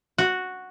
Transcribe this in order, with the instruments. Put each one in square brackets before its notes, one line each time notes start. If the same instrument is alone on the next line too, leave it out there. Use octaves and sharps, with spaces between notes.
[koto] F#4